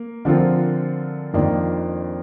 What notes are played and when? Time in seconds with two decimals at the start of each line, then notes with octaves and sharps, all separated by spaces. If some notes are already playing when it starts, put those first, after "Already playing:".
Already playing: A#3
0.25 D3 F3 C4 F4 A#4
1.33 F2 D#3 A#3 D4 F4